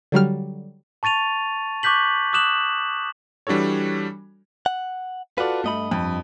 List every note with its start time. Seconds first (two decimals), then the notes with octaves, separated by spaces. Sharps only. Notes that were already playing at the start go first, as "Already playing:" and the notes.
0.12 D3 F#3 G3 F6
1.03 A5 C#6 A6 D#7 F7
1.83 C#6 D6 F#6 G6 B6 F#7
2.33 D6 D#6 F#6 E7 F#7
3.47 E3 G3 D4 F#4 A4 C#5
4.66 F#5
5.38 F4 F#4 A4 B4 D5
5.64 G2 A3 D#5 B5
5.91 F2